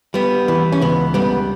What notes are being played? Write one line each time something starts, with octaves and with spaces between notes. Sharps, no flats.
G3 B3
E3
C#4
C#2 B3
G3 B3